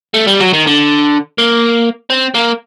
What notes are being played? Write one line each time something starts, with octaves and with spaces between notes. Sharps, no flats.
A3
G3
F#3
D#3
D3
A#3
C4
A#3